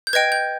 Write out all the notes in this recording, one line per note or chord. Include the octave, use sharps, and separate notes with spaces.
G6
B4 D#5 G5 G#6
G6